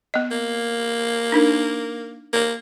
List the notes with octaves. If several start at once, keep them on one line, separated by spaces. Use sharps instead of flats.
B3 D#5
A#3
D4 D#4 A#4
A#3